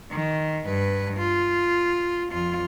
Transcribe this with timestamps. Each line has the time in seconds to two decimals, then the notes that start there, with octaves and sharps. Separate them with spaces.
0.11 D#3
0.66 G2 B4
1.18 F4
2.32 F2 F4